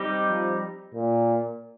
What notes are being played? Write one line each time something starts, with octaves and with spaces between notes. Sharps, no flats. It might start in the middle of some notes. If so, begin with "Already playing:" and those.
Already playing: G3 C4 D#4 G4
F3
A#2